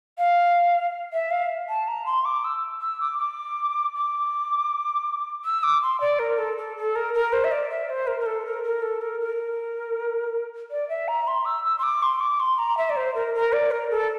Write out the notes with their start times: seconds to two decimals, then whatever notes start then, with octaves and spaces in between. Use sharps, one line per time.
0.19 F5
1.13 E5
1.31 F5
1.69 A5
1.88 A#5
2.06 C6
2.25 D6
2.44 E6
2.82 E6
3.01 D6
3.19 D6
3.95 D6
5.45 E6
5.63 D6
5.82 C6
6.01 D5
6.19 A#4
6.38 A4
6.58 A4
6.77 A4
6.96 A#4
7.14 A#4
7.33 C5
7.44 E5
7.52 D5
7.70 E5
7.90 C5
8.07 A#4
8.20 A#4
8.26 A4
8.46 A#4
8.64 A#4
8.82 A4
9.01 A#4
9.21 A#4
10.71 D5
10.89 E5
11.08 A#5
11.28 C6
11.45 E6
11.65 E6
11.79 C6
11.83 D6
12.03 C6
12.21 D6
12.40 C6
12.58 A#5
12.78 E5
12.90 D5
12.96 C5
13.15 A#4
13.35 A#4
13.53 D5
13.71 A#4
13.91 A4